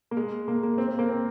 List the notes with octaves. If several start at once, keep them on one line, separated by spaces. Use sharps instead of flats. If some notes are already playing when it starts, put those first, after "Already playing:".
A#3
G#3
A#3
A#3
C4
C4
A#3
C4